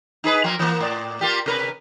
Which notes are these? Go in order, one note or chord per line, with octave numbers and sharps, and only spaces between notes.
D#4 G#4 B4
F3 A#3 A#4
E3 A#3
A2 D5
A#3 F4 G4
C3 A#4 B4